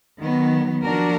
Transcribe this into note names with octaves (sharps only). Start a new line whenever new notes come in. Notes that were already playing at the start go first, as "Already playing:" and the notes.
D#3 F#3 B3
F3 A#3 D4 F#4 A#4